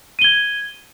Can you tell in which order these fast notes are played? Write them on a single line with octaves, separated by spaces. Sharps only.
D#7 G7 G#6